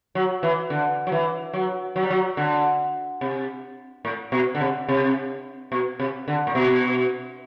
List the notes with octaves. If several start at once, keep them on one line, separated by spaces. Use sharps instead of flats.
F#3
E3
D3
F#3
E3
F#3
F#3
G3
F#3
D3
C3
A2
B2
D3
C3
C3
B2
C3
D3
A2
B2